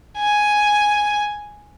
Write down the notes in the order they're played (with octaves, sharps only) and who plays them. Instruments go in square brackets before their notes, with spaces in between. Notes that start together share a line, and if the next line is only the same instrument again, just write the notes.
[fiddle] G#5